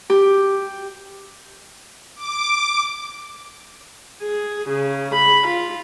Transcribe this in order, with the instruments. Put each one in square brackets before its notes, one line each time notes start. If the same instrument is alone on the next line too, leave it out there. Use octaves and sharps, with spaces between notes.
[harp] G4
[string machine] D6
[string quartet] G#4
C#3
B5
F4